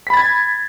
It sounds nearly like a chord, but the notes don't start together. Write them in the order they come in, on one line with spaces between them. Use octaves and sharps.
B6 B5 A6 G#6